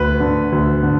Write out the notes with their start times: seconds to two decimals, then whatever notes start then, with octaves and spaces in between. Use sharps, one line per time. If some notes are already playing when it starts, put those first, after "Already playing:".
Already playing: D2 B4
0.20 D3
0.52 D2
0.83 D3